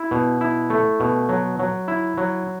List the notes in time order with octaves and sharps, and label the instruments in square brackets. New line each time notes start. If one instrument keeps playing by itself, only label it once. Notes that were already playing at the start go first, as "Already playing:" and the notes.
Already playing: [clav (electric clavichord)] E4
B2
E4
A3
B2
F#3
F#3
E4
F#3